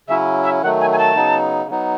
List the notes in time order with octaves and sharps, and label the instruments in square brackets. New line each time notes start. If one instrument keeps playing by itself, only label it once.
[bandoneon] C#3 F#3 C#4 E4 [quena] E5
[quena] E5
[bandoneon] D#3 F#3 A3 [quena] F#5
[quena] G#5
G#5
A5
[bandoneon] C#3 F#3 B3 D#4
F#3 B3 D#4